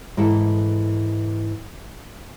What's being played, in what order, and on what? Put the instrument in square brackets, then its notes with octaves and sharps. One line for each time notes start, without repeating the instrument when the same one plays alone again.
[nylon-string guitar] G#2 E3 E4 A4